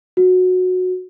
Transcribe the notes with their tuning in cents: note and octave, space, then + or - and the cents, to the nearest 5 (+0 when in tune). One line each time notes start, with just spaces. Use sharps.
F#4 -15